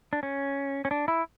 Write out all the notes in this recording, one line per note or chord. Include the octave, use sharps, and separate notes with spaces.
D4
C#4
C#4
D4
E4